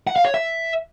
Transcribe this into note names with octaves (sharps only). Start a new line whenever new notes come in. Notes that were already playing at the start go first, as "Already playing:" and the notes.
F#5
F5
C#5
E5